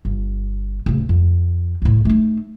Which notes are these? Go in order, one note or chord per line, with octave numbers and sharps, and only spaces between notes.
G1
D1 C#3
F2
D2 A2
A3 D#4